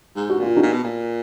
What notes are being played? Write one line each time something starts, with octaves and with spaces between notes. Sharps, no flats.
G#2
F#4
A#2 F4
D#4 F#4
A#2
B2
A#2